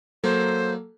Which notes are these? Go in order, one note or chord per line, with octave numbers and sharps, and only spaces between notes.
F#3 A#3 A4 C5